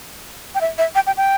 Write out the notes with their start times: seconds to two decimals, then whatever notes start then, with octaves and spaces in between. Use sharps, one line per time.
0.55 G5
0.61 E5
0.78 E5
0.95 G5
1.07 G5
1.17 G5